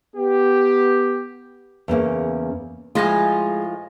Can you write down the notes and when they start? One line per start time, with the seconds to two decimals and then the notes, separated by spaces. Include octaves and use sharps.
0.16 B3 G4
1.88 E2 C#3 A#3 C#4
2.95 A2 F3 G#3 F4 D#5 G#5 A#6